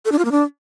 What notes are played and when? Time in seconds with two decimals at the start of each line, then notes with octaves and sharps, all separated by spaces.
0.05 A4
0.12 D4
0.18 F4
0.25 A#3
0.31 D4